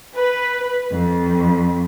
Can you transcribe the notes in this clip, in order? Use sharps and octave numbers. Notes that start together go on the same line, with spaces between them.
B4
F2